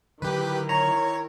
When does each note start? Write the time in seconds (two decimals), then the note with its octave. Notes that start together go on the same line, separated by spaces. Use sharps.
0.22 D3 D#3 F#3 D4 E4 G4 B4
0.69 C#5 A#5